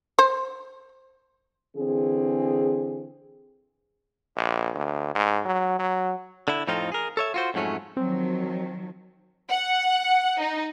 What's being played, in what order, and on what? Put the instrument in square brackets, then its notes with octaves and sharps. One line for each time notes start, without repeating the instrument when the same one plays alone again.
[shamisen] C5
[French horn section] D3 E3 C4 G#4
[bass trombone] A#1
D2
G#2
F#3
F#3
[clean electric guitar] D3 E4
F2 A2 F3 C4 D#4 F4
G#4 A#4
A4 C#5 E5
F4 F#4 C5
F2 G#2 F#3 A3 C#4
[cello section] D#3 F3 F#3 [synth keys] C4
[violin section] F#5
D#4